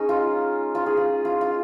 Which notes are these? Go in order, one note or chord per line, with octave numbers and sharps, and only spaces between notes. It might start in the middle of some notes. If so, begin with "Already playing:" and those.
Already playing: G#3 C#4 D#4
F4
F4
G#4
F4
F4
F4